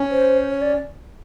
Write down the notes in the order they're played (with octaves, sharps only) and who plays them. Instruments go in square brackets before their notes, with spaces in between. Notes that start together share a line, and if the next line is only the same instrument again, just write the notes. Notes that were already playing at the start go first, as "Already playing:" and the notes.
Already playing: [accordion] C#4
[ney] C5
C#5
D5